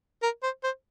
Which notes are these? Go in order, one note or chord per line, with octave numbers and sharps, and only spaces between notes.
A#4
C5
C5